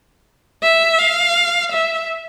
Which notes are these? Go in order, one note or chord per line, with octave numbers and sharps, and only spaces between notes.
E5
F5
E5